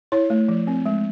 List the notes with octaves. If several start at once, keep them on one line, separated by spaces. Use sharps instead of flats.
E4 C#5
A3
F3
C4
G#3